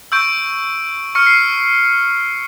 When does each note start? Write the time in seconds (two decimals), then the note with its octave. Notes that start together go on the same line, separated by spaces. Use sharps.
0.12 C#6 E6 G6 D7
1.15 C#6 F6 C#7
1.27 C7